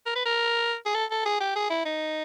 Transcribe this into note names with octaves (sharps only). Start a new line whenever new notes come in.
A#4
B4
A#4
G#4
A4
A4
G#4
G4
G#4
E4
D#4